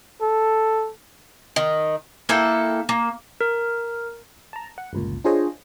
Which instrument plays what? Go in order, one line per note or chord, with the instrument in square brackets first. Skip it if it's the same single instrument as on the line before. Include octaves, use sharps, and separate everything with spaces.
[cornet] A4
[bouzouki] D#3
A#3 E4 A4 G5
A#3
[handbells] A#4
[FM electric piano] A5 A#5
F#5
G1 C#2 A#2
D4 F4 G#4 C5 C#5 D#5